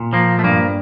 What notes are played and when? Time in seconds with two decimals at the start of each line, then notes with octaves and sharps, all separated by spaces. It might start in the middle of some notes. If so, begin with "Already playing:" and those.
Already playing: A#2
0.13 F3 A#3
0.39 A3
0.44 G2 A#3